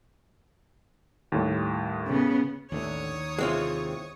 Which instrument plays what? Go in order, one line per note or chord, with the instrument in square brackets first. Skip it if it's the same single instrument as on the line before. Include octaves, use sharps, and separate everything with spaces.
[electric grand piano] D#2 A2 G3
[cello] C#3 B3
[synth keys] A1 D3 E3 [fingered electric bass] D#2 [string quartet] C#5 C#6 D#6
[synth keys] C3 E3 [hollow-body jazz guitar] G#3 C4 F4